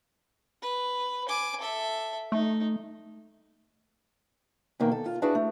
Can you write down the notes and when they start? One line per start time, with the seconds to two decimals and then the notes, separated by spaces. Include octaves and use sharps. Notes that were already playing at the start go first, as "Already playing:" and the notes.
0.62 B4
1.28 G#5 D6
1.61 A4 E5
2.32 A3 D#4
4.80 E2 B2 D#3 A#3
4.92 A4
5.06 F4
5.22 D4 E4 F#4 G#4 B4
5.35 A3